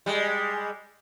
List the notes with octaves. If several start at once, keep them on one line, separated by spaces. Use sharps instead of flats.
G3 G#3